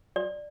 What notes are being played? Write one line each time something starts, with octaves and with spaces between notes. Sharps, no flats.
D5